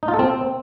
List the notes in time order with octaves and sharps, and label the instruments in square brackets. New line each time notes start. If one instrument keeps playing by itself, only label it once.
[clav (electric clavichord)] D#4
F4
A4
C4